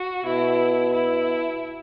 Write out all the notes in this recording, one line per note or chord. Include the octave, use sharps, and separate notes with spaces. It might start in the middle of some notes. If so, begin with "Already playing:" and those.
Already playing: F#4
B2 E4
E4